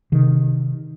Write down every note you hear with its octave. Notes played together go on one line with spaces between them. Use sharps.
C3 D#3